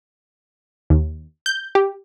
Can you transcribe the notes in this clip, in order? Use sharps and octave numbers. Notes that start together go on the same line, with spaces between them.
D#2
G6
G4